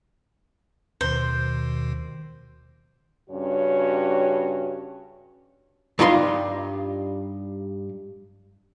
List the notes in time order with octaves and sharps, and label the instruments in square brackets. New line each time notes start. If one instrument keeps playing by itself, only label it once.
[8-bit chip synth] D#2 B2 D#3 [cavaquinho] C5
[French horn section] G2 C#3 C#4 F#4 C#5
[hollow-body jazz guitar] G2 G3 D#4 F4 B5 C6